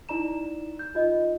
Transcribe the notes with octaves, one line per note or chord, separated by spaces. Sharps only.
D#4 E4 D5 A#5 E7
G6
D#4 F4 D#5